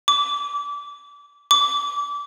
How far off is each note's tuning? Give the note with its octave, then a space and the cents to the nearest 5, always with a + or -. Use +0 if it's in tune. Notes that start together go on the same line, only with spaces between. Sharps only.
D6 -25
D6 -25